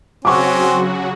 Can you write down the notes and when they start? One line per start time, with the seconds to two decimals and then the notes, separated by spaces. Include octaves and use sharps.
0.25 C#3 F#3 C4 C#4 F#4 C#6 D6